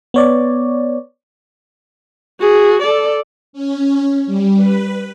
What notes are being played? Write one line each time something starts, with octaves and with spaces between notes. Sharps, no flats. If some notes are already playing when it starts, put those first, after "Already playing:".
B3 C#5 D5
F#4 G#4
A4 D5
C#4
G3
B4